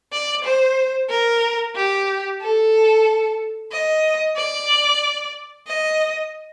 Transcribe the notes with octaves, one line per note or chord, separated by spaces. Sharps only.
D5
C5
A#4
G4
A4
D#5
D5
D#5